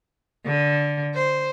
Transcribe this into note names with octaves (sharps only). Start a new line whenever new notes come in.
D3
C5